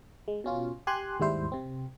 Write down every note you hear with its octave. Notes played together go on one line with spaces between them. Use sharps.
G#3
B2 C#4 F4
G4 G#5 C6 F#6
D#2 G#2 G3 E4 C5
C3 C4